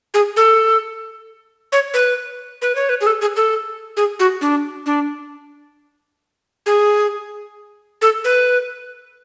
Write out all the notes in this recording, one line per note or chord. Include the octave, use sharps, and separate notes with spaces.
G#4
A4
C#5
B4
B4
C#5
B4
G#4
A4
G#4
A4
G#4
F#4
D4
D4
G#4
A4
B4